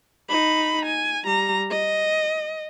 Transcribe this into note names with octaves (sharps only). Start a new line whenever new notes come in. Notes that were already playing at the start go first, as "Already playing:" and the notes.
D#4 B5
G#5
G3 A#5
D#5